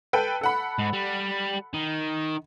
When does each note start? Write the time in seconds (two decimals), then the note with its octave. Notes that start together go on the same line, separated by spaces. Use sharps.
0.13 A4 B4 G5
0.41 A4 F#5 B5
0.79 G#2
0.93 G3
1.74 D#3